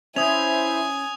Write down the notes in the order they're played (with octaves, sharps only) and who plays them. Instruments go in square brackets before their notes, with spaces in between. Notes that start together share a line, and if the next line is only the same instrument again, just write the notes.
[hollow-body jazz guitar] C#4 [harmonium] E4 C5 E5 [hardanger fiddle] G#5 [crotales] D#6 F7